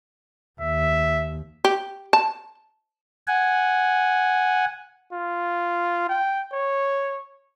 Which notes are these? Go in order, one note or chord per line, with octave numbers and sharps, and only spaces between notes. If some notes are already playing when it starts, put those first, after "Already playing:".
D#2 E5
G4
A5
F#5 G#5
F4
G5
C#5